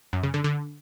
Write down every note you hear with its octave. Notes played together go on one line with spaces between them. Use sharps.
F#2
C#3
D3
D3